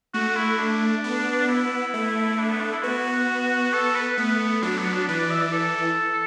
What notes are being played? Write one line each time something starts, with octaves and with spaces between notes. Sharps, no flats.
A3 F#4
E4
D4
B3
E4
A3
D4
B3
D4
E4
B3 F#4
A4
B4
A3 B3
F#3 D4
B3
D4
E3 B4
D5
E5
D5
A4